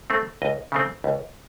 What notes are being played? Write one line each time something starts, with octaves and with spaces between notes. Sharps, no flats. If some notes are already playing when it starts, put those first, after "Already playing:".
A3 C4
C#2 D#5
C#3 A3 C4
C#2